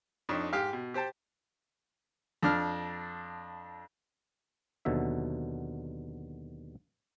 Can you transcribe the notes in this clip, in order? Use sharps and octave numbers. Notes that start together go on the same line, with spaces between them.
F2 D4 D#4 C#5
G#2 G4 F5
B2
G4 C5 G5 A5
F2 D4 F6
D#2 B2 D3 F#3 E5